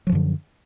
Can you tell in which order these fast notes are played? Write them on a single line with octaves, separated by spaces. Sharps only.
F#3 F3 F#2 D3